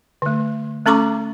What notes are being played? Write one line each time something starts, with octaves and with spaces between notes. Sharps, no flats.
D3 A3
A3 C#4 A4 A#5 C#6 D6